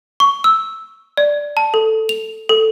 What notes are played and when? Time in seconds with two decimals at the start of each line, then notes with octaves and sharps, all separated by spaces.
0.20 C#6
0.44 E6
1.17 D5
1.57 A5
1.74 A4
2.09 F7
2.49 A4